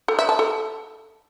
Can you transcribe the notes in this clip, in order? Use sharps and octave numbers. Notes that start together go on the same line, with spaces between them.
A4
E5
A5
A4